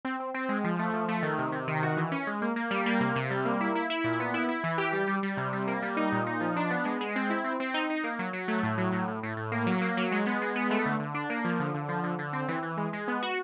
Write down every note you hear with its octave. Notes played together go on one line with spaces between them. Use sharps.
C4
C4
C4
G#3
F3
A3
F3
A3
D#3
C3
C3
D#3
F#4
E3
C#4
G#3
A#3
A#3
G3
A#3
C3
C3
G3
A#3
E4
E4
E4
A#2
B3
E4
E4
E3
G4
G3
G3
G3
C3
G3
A#3
G3
D#4
A#2
D#4
F3
D4
B3
G#3
G#3
C4
E4
C4
C4
D#4
D#4
A#3
F#3
F#3
A3
A2
F#3
A2
A2
A2
A2
A#3
F#3
A#3
F#3
G#3
B3
G#3
B3
A3
D3
D3
D4
A#3
F3
D3
D3
F3
D3
D3
C4
E3
E3
G#3
G#3
B3
F#4